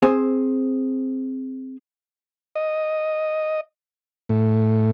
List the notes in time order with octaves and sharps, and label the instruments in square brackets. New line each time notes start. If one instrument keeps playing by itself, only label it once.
[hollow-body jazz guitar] C4 G#4 C5 G#5
[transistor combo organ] D#5
A2